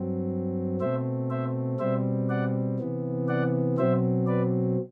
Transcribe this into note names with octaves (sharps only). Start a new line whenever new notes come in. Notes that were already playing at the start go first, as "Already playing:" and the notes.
Already playing: G2 F#3 C4
B2 A3 C4 C5 E5
C5 E5
B2 G3 C4 C5 E5
D5 F#5
C3 E3 B3
D5 F#5
B2 F#3 C4 C5 E5
B4 D5